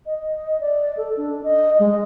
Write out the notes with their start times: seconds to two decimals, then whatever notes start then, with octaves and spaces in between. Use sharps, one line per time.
0.06 D#5
0.60 D5
0.97 A4
1.17 D4
1.44 D#5
1.79 G#3